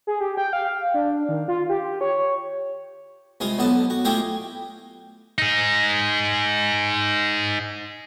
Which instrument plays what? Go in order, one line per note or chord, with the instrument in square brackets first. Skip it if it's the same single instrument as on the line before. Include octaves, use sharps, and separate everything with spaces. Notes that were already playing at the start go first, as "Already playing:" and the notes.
[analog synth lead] G#4
G4
G5
F5
D4
D#3
F4
G4
C#5
[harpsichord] C2 G#3 F4 D#6
B1 D3 B3 D#5 A5
F#4
A3 E4 F4 G4 D#5 G#5
[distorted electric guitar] D#4 G#4